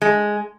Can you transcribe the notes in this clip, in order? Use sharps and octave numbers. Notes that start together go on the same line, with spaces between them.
G#3